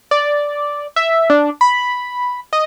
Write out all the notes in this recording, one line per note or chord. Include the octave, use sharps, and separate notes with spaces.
D5
E5
D4
B5
D#5